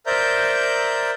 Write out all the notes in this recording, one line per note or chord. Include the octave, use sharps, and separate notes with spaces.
A#4 C5 D5 E5 A#5 G6